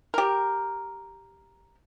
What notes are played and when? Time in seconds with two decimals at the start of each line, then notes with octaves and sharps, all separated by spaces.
0.14 G4 A#4